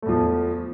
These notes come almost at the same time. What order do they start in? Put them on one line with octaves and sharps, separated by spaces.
A3 E2 F3